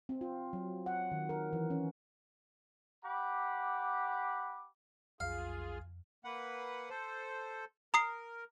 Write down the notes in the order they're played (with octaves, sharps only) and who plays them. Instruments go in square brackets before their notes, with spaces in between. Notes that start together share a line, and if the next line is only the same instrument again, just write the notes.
[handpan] C4
F4
F#3
F#5
D#3
A#4
E3
C#4
[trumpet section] G4 F#5 B5 D6
[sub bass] B1 [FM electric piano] F2 [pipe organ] F4 G#4 [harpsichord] F5
[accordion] A#3 B4 F#5
A4 C5
[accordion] A#4 [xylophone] A#5 D#6 C7